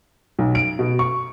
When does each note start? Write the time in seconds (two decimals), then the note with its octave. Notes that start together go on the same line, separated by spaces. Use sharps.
0.39 B1
0.55 D7
0.79 B2
0.99 C#6